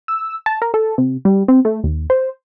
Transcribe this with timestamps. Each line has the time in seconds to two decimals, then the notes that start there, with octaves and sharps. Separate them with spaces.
0.08 E6
0.46 A5
0.62 A#4
0.74 A4
0.98 C3
1.25 G3
1.48 C4
1.65 A3
1.84 D#2
2.10 C5